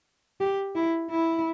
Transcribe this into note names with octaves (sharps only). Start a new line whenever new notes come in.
G4
E4
E4